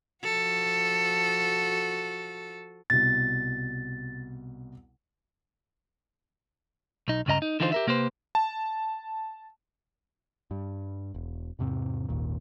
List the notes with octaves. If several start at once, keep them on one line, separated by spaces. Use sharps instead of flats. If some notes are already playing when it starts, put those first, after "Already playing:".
F3 F#4 A4
C2 B2 A6
B1 D#4
C#2 G2 C#3 D#5 A#5
D#4
D3 E3 D#4 F4 A4 C5
G4 A#4 E5
C3 A#3 G4 B4 C5
A5
G2 G3
E1
E2 G#2 C3 C4
G#1 D#2 A#2